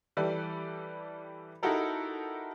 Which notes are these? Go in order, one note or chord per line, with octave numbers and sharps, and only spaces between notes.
E3 G3 G4 A4 B4 D5
D#4 E4 F#4 G4 A4 A#4